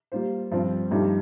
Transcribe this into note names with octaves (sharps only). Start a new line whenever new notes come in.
G3 A#3 F4 C5
G2 F3 C4
G2 F3 A3 D#4 G4